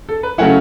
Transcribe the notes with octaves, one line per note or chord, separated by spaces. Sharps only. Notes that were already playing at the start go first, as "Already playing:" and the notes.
A4
B4
C#3 F#3 A3 C#4 E4 F#5